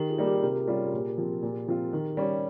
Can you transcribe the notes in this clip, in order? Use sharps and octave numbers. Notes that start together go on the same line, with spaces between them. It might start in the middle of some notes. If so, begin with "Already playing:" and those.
Already playing: D#3 G4 A#4
F4 G#4
G3 A#3 D#4
G4 A#4
C3 G4 A#4
G3 C#4 F4
A#2
F3 C4
A#2
F3 C4 F4
D#3
G3 C#4